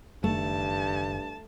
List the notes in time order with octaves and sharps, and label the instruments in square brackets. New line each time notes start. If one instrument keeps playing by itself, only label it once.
[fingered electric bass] F#1 D#3 [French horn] G2 [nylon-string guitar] A3 [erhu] A5